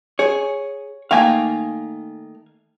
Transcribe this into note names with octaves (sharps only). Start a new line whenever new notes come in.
G#4 C#5
D#3 A3 A#3 F5 G#5